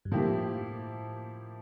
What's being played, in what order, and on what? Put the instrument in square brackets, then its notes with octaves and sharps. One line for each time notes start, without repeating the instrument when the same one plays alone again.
[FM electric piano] G2
[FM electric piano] A2 [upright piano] F3 A#3 E4 G4